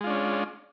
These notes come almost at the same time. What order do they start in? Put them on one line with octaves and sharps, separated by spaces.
G#3 F4 D4 C#4